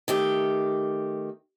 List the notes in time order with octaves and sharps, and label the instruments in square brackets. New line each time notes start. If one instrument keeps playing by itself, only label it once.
[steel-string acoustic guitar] D#3 A3 G4